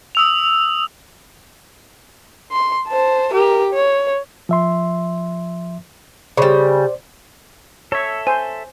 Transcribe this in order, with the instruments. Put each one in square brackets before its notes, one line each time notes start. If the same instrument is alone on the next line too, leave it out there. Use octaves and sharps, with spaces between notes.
[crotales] D#6 E6 F7
[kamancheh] C6
C5 A5
G4 A#4
C#5
[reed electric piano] F3 E5 C6
[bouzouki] C#3 G3 [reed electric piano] C5 D5
[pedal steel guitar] A4 E5 [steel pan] C#5
[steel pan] C5 [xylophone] G#5